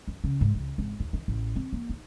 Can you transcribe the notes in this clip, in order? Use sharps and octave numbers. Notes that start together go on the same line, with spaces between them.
F#2
C#3
G#2
C#2
G#1
D#2
D#3
A1
C4
A#3
D#4